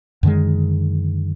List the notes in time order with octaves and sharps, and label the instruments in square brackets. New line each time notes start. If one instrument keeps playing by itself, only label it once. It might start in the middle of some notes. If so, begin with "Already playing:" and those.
[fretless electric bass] F#2 D3 D#3 G#3